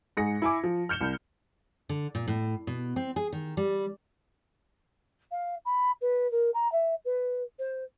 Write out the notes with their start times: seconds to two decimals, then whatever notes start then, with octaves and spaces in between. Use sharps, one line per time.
0.17 G#2 G#4 A#6 C#7
0.42 E4 G#5 D6
0.64 F3
0.89 F6 G6 C#7 E7 G7
1.01 C2
1.89 D3
2.15 A#2
2.28 A2
2.67 B2
2.96 C4
3.16 G#4
3.33 D#3
3.57 G3
5.32 F5
5.65 B5
6.01 B4
6.31 A#4
6.54 A#5
6.72 E5
7.05 B4
7.59 C5